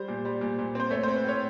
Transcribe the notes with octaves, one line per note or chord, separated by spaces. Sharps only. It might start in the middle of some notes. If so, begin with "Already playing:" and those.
Already playing: G3 C5
A#2
G3
A#2
A#2
C4 C5
A3 C#5
C4 C5
B4
A2 C#5